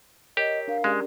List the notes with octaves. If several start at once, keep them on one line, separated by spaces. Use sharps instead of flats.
G4 A#4 C#5 D#5
D4 A#4 F5
G#3 C#4 G4 D5